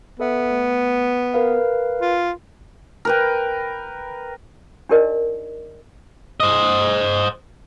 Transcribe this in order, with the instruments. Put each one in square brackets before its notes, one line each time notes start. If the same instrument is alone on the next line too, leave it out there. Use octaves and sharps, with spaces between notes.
[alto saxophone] B3 [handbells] A4 E5
[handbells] A3
A#4 B4 F5
[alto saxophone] F4
[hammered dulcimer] A#4 B4 G5
[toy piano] D4 D#4 G4 A#4 D5 D#5
[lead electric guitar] C5 D#5